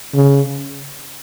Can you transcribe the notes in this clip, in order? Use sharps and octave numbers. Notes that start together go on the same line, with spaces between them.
C#3